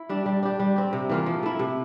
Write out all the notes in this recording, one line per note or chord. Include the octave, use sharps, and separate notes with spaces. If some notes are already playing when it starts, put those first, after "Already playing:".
Already playing: E4
G3 D4
G3
D4 G4
G3
C4 G4
C3
E3 A#3 F4
F3
A3 E4
C3